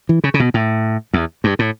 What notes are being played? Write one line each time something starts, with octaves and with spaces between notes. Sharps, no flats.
E3
C#3
C#3
B2
A2
E2
G2
A2